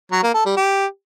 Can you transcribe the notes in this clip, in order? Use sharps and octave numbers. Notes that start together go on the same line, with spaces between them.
F#3
A#3
A4
G3
G4